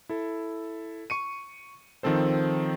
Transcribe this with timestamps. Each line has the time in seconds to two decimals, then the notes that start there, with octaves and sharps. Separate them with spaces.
0.09 E4 A4
1.10 C#6 C#7 D#7
2.03 D#3 F3 C4 A4 C5